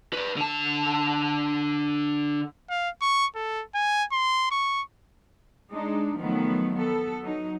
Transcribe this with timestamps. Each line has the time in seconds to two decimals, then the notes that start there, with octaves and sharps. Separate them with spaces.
0.13 B4 D5
0.36 D3 A5
2.70 F5
3.01 C#6
3.35 A4
3.74 G#5
4.12 C6
4.51 C#6
5.71 G#3 D4 D#4
6.17 D#3 F3 F#3 A3 B3
6.75 B3 A4
7.21 F#3 D#4